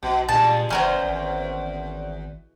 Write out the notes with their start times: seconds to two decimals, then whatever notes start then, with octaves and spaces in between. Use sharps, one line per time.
0.03 B1 B2
0.29 G2 A#2 G#3 A5
0.70 F#1 E2 C#4 A#4 C5
1.04 G#1